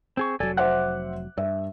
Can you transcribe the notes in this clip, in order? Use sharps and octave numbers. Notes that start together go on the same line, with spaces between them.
C4 G#4 C#6
F1 F#3 A4 D5 G#5
C5 E5 F#5 D6 F#6
G2 E5